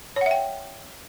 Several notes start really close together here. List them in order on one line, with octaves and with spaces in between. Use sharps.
C#5 F#5 E5 G5